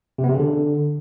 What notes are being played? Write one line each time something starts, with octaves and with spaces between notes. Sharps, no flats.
C3
B3
C3
C#3
D3